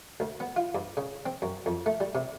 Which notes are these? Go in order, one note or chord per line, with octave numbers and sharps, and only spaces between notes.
D2
B3
F4
G2
C#3
C4
F#2
F2
A3
G3
C3